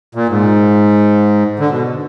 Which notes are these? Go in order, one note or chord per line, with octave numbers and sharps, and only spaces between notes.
A#2
G#2
D3
B2